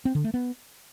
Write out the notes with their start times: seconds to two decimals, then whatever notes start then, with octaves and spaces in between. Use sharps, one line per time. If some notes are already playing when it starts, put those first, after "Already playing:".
0.05 C4
0.15 D3
0.24 A3
0.34 B3